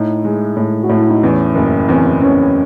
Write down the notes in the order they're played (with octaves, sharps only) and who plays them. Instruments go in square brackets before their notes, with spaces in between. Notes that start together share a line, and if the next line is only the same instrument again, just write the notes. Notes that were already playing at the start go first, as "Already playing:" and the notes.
Already playing: [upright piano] A2 [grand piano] D#4
[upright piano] G#3
A2
[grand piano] F#4
[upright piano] A2
[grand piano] E4
D#4
[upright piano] E2 [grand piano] C#4
[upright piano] F#1
[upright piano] E2 [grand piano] C4
[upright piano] E2 [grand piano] C#4